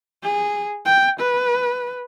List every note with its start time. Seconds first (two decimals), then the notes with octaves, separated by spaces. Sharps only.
0.23 G#4
0.86 G5
1.20 B4